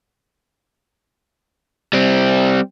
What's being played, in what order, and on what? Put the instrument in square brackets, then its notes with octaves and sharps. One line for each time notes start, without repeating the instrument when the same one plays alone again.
[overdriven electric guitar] G3 C4